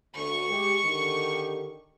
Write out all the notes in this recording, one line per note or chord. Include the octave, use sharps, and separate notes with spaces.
D2 C#6
G#3 G4
D3 D#3 G4